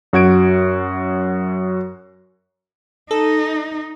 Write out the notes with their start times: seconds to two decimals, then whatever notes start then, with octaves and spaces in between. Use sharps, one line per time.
0.13 F#2 F#4 G#6 D7
3.11 D#4 A4